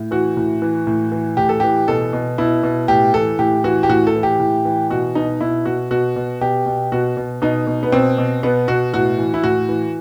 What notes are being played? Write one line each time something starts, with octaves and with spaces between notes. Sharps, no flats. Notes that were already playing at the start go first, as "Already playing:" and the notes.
Already playing: A2
E3 F#4
A2
E3
A2
E3
A2 G4
A4
E3 G4
B2 A4
B2
B2 E4
B2
A2 G4
E3 A4
A2 G4
E3 F#4
G4
A2 F#4
A4
E3
G4
A2
E3
B2 F#4
B2 D#4
B2 E4
B2 F#4
B2 F#4
B2
B2 G4
B2
B2 F#4
B2
B2 D#4
B2
B3
B2 C4
B2
B2 B3
B2 F#4
A2 F#4
E3
E4
A2 F#4
E3